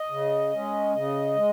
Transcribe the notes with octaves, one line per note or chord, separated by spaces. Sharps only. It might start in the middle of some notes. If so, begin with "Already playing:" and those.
Already playing: D#5
C#3
G#3 C#4
C#3 D#5
G#3